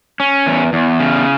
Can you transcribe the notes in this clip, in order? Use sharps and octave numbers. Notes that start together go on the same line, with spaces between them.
C#4
E2
E2
C#3